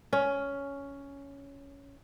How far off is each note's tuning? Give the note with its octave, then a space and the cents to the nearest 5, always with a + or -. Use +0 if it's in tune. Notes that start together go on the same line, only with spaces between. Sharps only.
C#4 +10